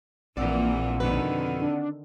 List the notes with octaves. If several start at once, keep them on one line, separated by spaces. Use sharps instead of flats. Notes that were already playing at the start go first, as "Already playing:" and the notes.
A#1 A#2 E3 A#3 C4 D5 F#5 E6
F2 B2 D3 D#3 B4
D4